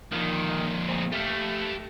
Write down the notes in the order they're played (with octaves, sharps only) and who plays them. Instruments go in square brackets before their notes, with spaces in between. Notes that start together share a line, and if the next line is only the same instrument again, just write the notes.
[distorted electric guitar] F2 A#2 [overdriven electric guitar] D#3
[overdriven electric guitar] C4 G#4
[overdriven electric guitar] A3 [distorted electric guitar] G4 F5